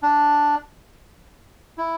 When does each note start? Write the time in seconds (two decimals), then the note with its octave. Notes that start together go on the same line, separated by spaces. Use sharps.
0.03 D4
1.78 E4